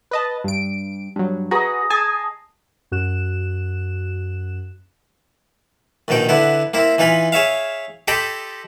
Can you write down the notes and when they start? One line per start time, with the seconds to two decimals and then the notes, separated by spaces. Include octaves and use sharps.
0.11 B4 D#5 A5
0.44 G2 D7
1.16 G2 F#3
1.51 F#4 G#4 B4 D#5 A#5
1.90 G#4 G#5 A5
2.92 F#2 F#4 F#6 E7
6.08 A#1 D#2 B2 D#4 G5
6.29 D3 B3 E4
6.74 A#3 C4 E4
6.98 E3 D#4 F4 G#5 B5
7.32 G#4 C#5 E5 F5
8.08 G4 A4 D#5 G5 B5 C6